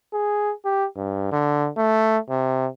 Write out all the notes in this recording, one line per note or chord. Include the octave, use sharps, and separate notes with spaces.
G#4
G4
G2
D3
A3
C3